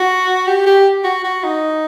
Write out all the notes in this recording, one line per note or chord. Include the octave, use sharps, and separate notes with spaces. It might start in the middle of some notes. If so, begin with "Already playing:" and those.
Already playing: F#4
G4
G4
F#4
F#4
D#4